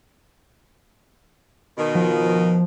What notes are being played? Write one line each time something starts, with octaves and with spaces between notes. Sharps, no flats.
B2 D#3
F3